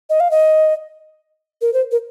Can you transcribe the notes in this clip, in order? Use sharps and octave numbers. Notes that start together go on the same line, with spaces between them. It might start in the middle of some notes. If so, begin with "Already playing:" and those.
D#5
F5
D#5
A#4
C5
A#4